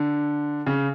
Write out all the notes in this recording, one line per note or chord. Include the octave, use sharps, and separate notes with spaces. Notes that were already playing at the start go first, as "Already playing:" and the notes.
Already playing: D3
C#3